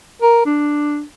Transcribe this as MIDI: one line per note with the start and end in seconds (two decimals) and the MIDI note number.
0.22 0.44 70
0.46 1.03 62